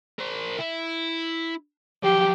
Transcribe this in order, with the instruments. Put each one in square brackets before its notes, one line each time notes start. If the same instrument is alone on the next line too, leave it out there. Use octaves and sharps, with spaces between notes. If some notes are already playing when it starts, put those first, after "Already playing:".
[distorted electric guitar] A#4 C5
E4
[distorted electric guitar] F3 F#3 [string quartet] G4